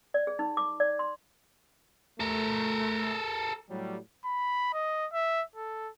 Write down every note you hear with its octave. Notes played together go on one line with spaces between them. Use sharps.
D5
G#4
D#4
D6
D5
C6
A3 A4 A#4
A2 F#3 G3
B5
D#5
E5
A4